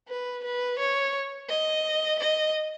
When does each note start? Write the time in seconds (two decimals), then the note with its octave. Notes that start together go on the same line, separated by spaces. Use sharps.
0.08 B4
0.44 B4
0.79 C#5
1.49 D#5
2.19 D#5